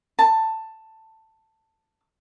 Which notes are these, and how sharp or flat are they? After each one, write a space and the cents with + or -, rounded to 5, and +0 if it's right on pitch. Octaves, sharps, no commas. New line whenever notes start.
A5 +10